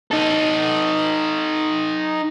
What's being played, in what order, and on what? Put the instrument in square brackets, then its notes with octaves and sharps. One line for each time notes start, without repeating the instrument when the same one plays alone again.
[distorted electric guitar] D#4 A4